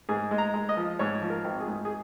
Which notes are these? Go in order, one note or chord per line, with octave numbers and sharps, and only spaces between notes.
G#2 G#4
G#3
A#5
G#3
D#5
F3
G#2 C#5
F3
A#4
G#1
G#4
G#2
G#4